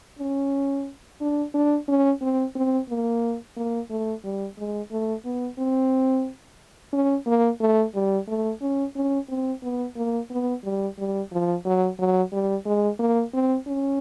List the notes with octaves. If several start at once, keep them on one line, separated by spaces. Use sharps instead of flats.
C#4
D4
D4
C#4
C4
C4
A#3
A#3
A3
G3
G#3
A3
B3
C4
C#4
A#3
A3
G3
A3
C#4
C#4
C4
B3
A#3
B3
G3
G3
F3
F#3
F#3
G3
G#3
A#3
C4
C#4